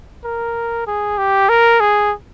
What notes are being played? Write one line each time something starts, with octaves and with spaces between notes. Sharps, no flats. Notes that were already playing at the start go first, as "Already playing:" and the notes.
A#4
G#4
G4
A#4
G#4